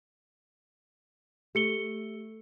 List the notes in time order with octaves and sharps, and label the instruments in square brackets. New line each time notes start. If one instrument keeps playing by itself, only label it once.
[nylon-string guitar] A3 [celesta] G4 C#7 G7